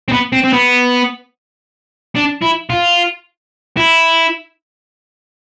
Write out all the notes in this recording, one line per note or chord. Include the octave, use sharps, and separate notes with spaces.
C4
B3
C4
C4
B3
D4
E4
F4
E4